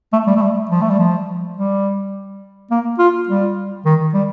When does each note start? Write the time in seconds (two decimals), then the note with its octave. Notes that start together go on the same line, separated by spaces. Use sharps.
0.13 A3
0.27 G3
0.36 A3
0.42 G3
0.70 F3
0.82 A3
0.90 G3
0.99 F3
1.56 G3
2.71 A#3
2.99 F4
3.28 G3
3.85 D#3
4.14 G3